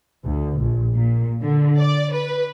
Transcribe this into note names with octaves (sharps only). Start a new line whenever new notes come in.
D2
A#1
A#2
D3
D5
B4